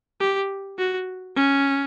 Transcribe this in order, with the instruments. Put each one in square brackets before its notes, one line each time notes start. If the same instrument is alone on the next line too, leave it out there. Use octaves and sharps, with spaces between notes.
[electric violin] G4
F#4
C#4